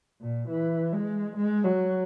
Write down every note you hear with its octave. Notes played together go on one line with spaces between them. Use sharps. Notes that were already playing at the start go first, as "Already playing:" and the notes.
A#2
E3
G#3
G#3
F#3